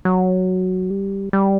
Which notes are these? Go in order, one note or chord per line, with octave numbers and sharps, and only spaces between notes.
F#3
G3
G3